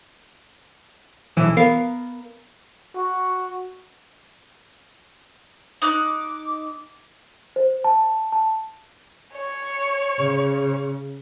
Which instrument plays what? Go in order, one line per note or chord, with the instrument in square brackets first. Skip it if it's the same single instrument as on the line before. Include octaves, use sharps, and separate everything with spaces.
[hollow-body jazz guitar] B1 E3 E4
B3 A#4 F5
[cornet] F#4
[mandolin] D#4 F#6 [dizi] D6
[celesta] C5
A5
A5
[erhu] C#5
[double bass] C#3